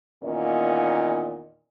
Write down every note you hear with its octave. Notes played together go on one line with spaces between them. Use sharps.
E2 A#2 D#3 A#3 C#4 D#5